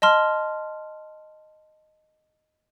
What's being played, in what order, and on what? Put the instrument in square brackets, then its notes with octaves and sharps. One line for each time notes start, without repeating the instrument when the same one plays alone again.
[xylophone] D#5 A5 C6 F6